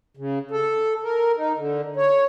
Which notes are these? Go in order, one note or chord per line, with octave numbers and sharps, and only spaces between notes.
C#3
A4
A#4
D#4
D3
C#5